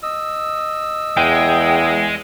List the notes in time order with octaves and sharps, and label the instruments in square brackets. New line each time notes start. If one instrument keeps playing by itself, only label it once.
[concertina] D#5 E6
[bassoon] E2 [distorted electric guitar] G#3 [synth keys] G5